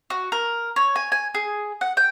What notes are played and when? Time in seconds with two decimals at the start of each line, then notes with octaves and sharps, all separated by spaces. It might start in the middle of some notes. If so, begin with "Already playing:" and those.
0.10 F#4
0.32 A#4
0.76 C#5
0.96 G#5
1.12 G#5
1.34 G#4
1.81 F#5
1.97 G5